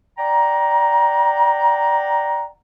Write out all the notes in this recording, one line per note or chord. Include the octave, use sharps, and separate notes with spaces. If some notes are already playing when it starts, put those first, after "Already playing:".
D5 F#5 G5 A#5